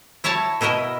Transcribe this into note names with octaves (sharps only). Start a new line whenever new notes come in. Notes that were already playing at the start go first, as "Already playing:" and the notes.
E4 C#5 E5 A5 A#5
B2 E4 A#4 D#5 E5